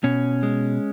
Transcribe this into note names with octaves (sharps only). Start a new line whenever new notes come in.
B2 C#4
G#3